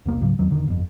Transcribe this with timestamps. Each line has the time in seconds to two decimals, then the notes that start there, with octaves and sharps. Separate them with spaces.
0.06 E1 C2 A#3
0.21 C#2 G#2 C#3 F#3
0.39 E2 D#3 F#3
0.50 E1 D3 D#3
0.67 G1 F2